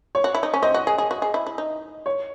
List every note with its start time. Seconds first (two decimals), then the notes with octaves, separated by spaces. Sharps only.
0.15 C#5
0.24 F#4
0.35 E4
0.43 D#4
0.54 C#4
0.62 C4 D#5
0.74 F#4
0.87 G#4
0.98 G#4
1.11 F#4
1.22 G#4
1.34 E4
1.47 E4
1.58 D#4
2.06 C#5